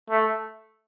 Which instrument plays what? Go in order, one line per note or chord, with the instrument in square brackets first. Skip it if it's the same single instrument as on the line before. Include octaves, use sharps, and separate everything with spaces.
[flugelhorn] A3